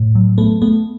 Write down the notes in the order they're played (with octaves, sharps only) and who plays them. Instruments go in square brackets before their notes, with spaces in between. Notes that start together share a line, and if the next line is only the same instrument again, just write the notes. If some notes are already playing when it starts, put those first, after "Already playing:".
Already playing: [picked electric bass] A2
F#3
[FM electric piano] A3 [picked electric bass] B3
[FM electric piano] A3 [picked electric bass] B3